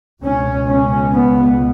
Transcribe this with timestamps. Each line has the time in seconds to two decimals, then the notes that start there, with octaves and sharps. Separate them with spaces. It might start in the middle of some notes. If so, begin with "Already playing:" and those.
0.22 C#2 B2 C#4
0.68 C#4
1.12 B3